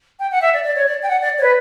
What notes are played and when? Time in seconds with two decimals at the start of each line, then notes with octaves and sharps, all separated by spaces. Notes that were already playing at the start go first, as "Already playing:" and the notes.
0.19 G5
0.32 F#5
0.42 E5
0.54 D5
0.64 D5
0.76 C#5
0.86 D5
1.03 G5
1.09 F#5
1.21 D5
1.39 C#5
1.43 B4